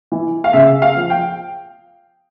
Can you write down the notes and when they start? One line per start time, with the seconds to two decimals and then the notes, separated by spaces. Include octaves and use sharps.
0.12 E3
0.44 F5
0.53 C#3 E5
0.82 F5
0.97 F3
1.10 G5